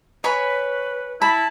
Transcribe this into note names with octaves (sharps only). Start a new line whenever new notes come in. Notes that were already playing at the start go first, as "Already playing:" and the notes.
B4 C#5 G#5 B5
E4 A5 B5